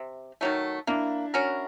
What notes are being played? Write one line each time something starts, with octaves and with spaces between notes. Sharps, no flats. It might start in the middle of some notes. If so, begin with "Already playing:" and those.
Already playing: C3
D#3 F#3 A3
A#3 D4 E4
C#4 F#4 A#4